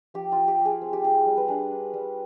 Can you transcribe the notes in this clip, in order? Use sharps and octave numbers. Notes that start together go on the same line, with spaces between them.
F3 G4
F3 F4
G4
F3
G#4
C4
G4
F4 G#4
G3
B4
D4 G#4
D4
G3